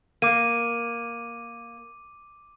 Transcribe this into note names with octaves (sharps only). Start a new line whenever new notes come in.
A#3 D6 D#7